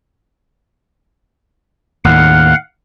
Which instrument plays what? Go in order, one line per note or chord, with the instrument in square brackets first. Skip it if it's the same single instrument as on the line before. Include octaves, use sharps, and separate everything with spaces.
[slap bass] D#2 A2 D#3 [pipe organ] F5 F#5